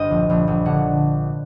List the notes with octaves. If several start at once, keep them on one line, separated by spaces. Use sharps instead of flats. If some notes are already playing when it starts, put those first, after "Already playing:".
Already playing: G1 C5 D#5
A#1
A#1
A#1
D3 F#5